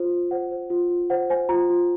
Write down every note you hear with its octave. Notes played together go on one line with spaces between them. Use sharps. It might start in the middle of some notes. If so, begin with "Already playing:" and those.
Already playing: F4 C5
F4
C5 F#5
C5
F4
F4
C5 F#5
C5 G#5
F4 A#5
F4